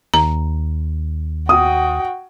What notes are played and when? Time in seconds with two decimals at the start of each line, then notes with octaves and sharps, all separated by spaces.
0.14 D#2 A#5
1.49 F#4 G5 D#6